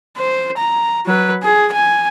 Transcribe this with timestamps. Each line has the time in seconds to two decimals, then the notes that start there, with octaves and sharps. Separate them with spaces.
0.17 C5
0.57 A#5
1.05 F#3 B4
1.43 G#4
1.72 G#5